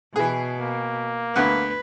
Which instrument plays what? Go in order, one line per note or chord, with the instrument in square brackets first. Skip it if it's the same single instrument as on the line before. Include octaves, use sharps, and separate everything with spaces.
[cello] B2 [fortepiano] E3 G#4
[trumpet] A#3
[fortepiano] D2 B3 F#5 [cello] B4